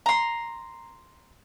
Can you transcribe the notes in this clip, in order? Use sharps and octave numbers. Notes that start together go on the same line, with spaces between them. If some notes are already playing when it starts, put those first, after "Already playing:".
A#5 C6